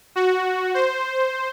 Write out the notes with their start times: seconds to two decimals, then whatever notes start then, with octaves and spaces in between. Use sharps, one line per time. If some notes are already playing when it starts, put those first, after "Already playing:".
0.16 F#4
0.74 C5